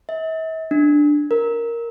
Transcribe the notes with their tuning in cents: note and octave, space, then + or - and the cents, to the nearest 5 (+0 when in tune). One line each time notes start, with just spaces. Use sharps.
E5 -45
D4 +5
A#4 +0